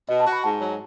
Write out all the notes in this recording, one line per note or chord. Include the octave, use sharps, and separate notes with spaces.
B2 D#5
A5
F#4
B5
G#2 A5
F#3